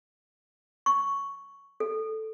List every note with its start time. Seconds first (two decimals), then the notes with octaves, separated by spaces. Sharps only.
0.86 C#6
1.80 A4